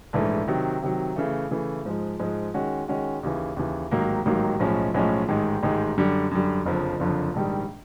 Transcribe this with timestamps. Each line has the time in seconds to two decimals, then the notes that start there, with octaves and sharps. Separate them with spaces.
0.13 A#1 G#2 E3 A3
0.48 C3 D#3 F#3
0.82 C3 D#3 F#3
1.16 C#3 E3 A3
1.51 C#3 E3 A3
1.85 G#2 F3 G#3
2.19 G#2 F3 G#3
2.54 D#3 G#3 C#4 F#4
2.88 D#3 G#3 C#4 F#4
3.23 D#2 C#3 E3
3.57 D#2 C#3 E3
3.91 A1 G#2 D#3 F#3 A#3
4.26 A1 G#2 D#3 F#3 A#3
4.59 B1 A2 F3 G#3 C#4
4.94 B1 A2 F3 G#3 C#4
5.29 A1 G#2 D#3 G#3
5.63 A1 G#2 D#3 G#3
5.97 F#2 D3 G3
6.31 F#2 D3 G3
6.66 F#1 F2 D3 F3
7.00 F#1 F2 D3 F3
7.34 A#1 G#2 D#3 G3